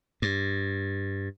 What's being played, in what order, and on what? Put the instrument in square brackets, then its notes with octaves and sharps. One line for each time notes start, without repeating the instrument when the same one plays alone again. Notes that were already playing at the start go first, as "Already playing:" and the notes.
[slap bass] G2